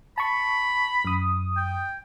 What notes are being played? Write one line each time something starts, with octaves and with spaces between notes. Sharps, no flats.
A5 B5 C#6
F#2 D#6
G5